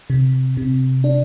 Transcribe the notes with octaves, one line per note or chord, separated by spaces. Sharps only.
C3
C3
D4